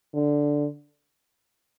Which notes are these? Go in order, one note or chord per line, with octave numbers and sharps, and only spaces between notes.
D3